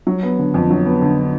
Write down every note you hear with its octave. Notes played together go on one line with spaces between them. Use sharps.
F#3
B3
D3
F2
F#3
B3
D3